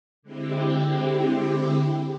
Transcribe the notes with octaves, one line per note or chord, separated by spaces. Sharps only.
D3 G#3 C4 E4 G4